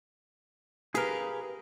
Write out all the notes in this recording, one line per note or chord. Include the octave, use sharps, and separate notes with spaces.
G4 G#4 A#4 B4 F5